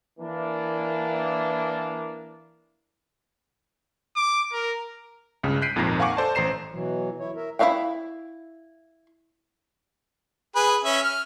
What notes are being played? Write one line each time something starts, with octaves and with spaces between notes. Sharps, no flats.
E3 A#3 D4
D6
A#4
C#2 G2 C#3
F#6 G6 B6 C7 D7 D#7
G#1 F2 A#2 D#3 A#4 A#6
F5 F#5 G#5 C#6 D6 F#6
A4 C5 D5 A5
A1 C5 A#5 C7 E7
B2 E3 F#3
E4 C#5
A#4 E5
E4 A#4 E5 F5 G5
G#4 B4
C#4 E5
F6